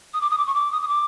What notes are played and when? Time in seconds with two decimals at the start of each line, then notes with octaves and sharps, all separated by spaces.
0.14 D#6
0.21 D6
0.31 D#6
0.38 D6
0.47 C#6
0.55 D6
0.72 D#6
0.82 D#6
0.88 D6